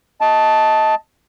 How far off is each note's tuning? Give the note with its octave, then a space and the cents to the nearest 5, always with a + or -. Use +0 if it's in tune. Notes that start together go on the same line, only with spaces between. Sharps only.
D#5 +20 A5 +0